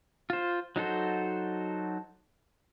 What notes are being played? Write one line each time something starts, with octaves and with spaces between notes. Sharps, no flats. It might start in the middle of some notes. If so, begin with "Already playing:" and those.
F4 C5
F#3 D#4 F#4 A4 C5